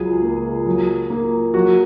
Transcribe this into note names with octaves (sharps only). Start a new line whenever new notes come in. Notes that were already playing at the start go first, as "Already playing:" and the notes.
Already playing: C#2 F#3 G#3 G#4
A#3
F#3
A#3
F#3 F#4